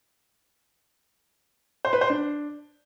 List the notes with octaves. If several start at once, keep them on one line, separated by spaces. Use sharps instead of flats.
C5
B4
C5
D4